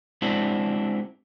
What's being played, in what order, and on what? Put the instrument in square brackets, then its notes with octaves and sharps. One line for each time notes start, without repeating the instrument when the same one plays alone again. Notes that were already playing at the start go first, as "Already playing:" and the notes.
[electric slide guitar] G#3 C4 D4 E4 F#4